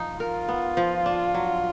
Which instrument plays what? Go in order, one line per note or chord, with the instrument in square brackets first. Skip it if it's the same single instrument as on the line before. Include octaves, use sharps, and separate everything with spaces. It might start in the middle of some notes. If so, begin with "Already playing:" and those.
Already playing: [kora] F3 D#4
[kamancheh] F4 [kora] A#4
[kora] B3
F3
D4
F#3